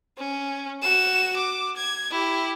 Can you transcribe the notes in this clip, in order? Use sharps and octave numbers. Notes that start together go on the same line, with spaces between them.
C#4
F#4 E7
D6
G#6
E4 G4